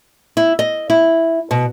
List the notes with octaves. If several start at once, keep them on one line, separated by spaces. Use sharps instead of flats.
E4
D#5
E4
B2